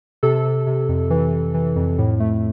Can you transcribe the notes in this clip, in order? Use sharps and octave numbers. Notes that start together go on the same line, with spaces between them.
C3 A4
C3
C3
F2
E3
E3
E3
F2
A2
A3